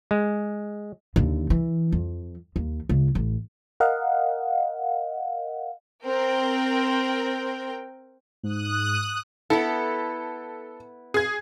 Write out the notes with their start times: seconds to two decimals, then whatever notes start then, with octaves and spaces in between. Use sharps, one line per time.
0.11 G#3
1.16 D#2 D3
1.50 E3
1.92 F2
2.56 D#2
2.89 C#2
3.15 A1
3.80 A#4 D#5 F5 F#5
6.03 C4 A#4 G5
8.43 G#2 D#6 F#6
9.50 B3 E4 A4
11.14 G#4 G#6